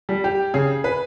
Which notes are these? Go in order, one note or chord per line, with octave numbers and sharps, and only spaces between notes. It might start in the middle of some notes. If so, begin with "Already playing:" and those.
G3
G4
C#3 G#4
B4